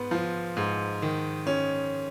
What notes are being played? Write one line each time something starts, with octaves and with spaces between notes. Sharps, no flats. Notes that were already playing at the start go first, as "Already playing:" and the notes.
Already playing: G#2 B3
F3
G#2
D#3
C#4